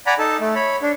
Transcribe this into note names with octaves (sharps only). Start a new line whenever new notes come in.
D5 F#5 G#5 A#5 B5
D#4 A4 A5
A3
C#5 B5
D4